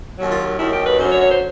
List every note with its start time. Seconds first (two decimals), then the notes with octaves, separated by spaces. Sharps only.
0.18 D#2 D#3 F#3
0.31 F4
0.59 D#2 D#3 F#3 E4
0.72 G4
0.86 B4
0.99 F#2 D3 F#3 C5
1.09 C#5
1.19 C#5
1.29 C5